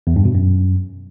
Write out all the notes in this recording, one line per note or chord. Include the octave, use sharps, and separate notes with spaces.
E2
G2
B2
F#2